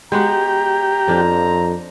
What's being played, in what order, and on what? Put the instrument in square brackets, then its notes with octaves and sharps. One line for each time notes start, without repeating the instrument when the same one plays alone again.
[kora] G#3 B3 F#4 [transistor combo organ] G4 [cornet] A#5
[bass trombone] F2 [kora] F3 D4